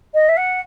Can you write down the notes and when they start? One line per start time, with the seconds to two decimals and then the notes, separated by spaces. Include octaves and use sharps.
0.14 D#5
0.28 E5
0.36 F#5